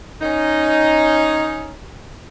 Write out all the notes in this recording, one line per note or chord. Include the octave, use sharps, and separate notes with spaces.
C#4 D#4